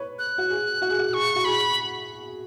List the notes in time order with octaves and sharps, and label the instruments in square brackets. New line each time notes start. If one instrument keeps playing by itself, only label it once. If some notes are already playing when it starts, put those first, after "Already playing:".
Already playing: [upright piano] B4 C#5
[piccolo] F#6
[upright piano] F#4
G#4
F#4
G#4
F#4
[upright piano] G#4 [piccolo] C#6
[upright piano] F#4
[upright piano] G#4 [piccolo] B5